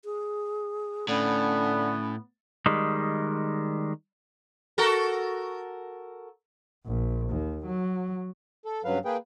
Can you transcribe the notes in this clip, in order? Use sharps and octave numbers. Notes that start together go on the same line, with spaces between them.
G#4
A2 D3 B3 C#4
D#3 G3 G#3
F#4 A4 A#4
A#1
D#2
F#3
A4
G2 C#3 F#3 B4 F5
A#3 G#4 B4 G5